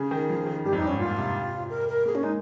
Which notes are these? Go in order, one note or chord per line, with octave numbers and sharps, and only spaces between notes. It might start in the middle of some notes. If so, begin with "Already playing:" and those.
Already playing: C#3 G#4
D#3
F3
D#3
G2 G4
F2
D#4
G2
G#2 C#4
A#2 F4
C3
A#4
A#4
A#3 G#4
C#4
G#3 D#4